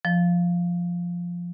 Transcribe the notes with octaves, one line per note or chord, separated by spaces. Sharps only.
F3